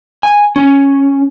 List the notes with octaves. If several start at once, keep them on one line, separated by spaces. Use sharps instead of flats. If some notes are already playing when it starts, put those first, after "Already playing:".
G#5
C#4